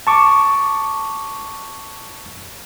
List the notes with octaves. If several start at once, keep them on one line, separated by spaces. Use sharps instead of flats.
A5 C#6 D6